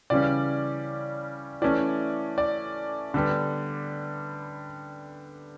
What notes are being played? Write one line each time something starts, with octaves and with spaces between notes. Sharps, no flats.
C#3 E3 G3 C#4 D5
E3 A3 C#4 D5
D5
D3 G3 B3